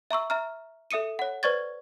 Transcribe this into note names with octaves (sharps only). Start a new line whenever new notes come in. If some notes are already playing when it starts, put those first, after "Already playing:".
E5 A#5 C#6 E6
E5 A#5 F6
A4 E5 D#6 C#7 D#7
C#5 F#5
B4 C5 D5 C#6 G#6 A6